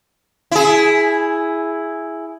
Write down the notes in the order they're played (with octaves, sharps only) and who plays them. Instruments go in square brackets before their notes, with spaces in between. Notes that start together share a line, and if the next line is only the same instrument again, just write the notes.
[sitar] E4 G#4